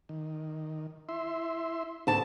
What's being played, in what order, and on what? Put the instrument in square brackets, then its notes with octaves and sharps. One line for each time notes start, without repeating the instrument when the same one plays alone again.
[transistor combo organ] D#3
E4 E5 C6
[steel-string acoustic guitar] D2 A5 [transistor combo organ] G#2 C4